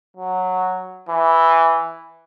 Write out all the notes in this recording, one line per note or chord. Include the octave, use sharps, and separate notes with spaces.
F#3
E3